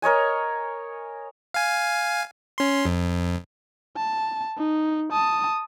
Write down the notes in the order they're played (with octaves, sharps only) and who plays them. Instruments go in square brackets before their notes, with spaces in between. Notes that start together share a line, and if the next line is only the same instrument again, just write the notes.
[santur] A#4 C#5 D#5 G#5
[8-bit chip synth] F5 G#5
C#4 C6
F2
[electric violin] A5
D#4
A5 D#6